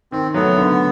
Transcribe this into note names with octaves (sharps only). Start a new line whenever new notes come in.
D#3 C4
F#3 A3 B3
D3